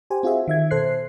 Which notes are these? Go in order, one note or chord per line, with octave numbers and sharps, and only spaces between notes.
G4 C5 G#5
C4 F4 F#4 G#4 E5
D#3 E5 G#6
B2 A4 C5 F#6 C7